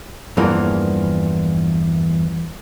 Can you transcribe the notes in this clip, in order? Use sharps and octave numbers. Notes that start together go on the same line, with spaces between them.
E2 G2 E3 F3 A#3